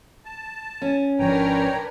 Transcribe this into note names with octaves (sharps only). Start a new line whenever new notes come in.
A5
C#4
G#1 F3 D4 A#4 B4 C#5 G5 A#5